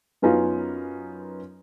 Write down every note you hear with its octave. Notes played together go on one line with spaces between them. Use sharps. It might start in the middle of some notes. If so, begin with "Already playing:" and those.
F#2 B3 C#4 D#4 F4